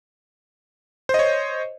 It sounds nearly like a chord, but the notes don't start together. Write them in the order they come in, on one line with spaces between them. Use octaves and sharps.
C5 D#5 C#5